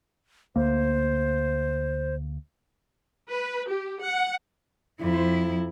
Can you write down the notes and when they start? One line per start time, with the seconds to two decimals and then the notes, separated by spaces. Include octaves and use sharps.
0.56 D2 A#3 C5
3.30 B4
3.69 G4
4.01 F#5
5.00 F2 E4